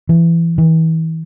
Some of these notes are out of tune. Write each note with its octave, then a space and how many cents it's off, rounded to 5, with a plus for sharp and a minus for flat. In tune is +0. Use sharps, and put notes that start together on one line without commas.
E3 +20
E3 -35